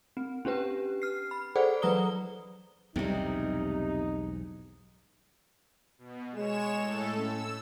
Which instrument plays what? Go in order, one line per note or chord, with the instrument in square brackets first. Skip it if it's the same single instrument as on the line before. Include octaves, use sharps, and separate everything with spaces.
[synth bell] C4
C#4 D4 G4 B4
F6 C7
B5
G#4 A4 C5 D5 F#5
E3 F#3 B4 A#5 D#6 G7
[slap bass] B1 E2 G#2 [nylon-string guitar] C3 G3 [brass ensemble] D#4
[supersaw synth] B2
[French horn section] G#3 [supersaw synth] C#5 E7
[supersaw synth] A2 A4
[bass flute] C#4 [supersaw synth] E6